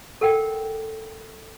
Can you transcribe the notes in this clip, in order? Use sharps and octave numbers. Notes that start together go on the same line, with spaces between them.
A4 A#4 F#5 G5